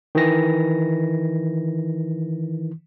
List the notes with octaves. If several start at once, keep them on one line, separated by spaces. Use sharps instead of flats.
D#3 E3 A#6